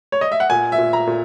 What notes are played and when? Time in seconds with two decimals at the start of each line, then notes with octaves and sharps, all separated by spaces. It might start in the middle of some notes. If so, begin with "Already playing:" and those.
0.12 C#5
0.21 D#5
0.32 E5
0.40 F#5
0.50 A#2 G#5
0.72 E5
0.78 A#2
0.93 A#5
1.07 A#2